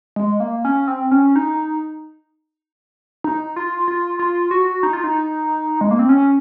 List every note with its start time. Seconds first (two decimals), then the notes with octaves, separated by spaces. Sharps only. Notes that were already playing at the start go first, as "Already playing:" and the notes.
0.16 G#3
0.40 A#3
0.65 C#4
0.88 C4
1.11 C#4
1.36 D#4
3.24 D#4
3.56 F4
3.88 F4
4.19 F4
4.51 F#4
4.83 D#4
4.93 F4
5.04 D#4
5.81 G#3
5.91 A#3
5.99 C4
6.09 C#4